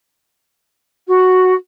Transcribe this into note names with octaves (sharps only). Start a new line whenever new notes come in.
F#4